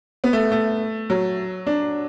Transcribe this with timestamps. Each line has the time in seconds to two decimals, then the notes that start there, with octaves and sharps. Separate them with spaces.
0.24 B3
0.33 A3
0.52 A3
1.10 F#3
1.67 D4